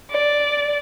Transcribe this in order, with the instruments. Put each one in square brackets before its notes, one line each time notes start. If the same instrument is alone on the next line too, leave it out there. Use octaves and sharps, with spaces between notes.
[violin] D5